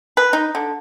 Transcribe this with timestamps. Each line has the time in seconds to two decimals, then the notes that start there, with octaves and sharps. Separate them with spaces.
0.17 B4
0.33 D#4
0.55 D3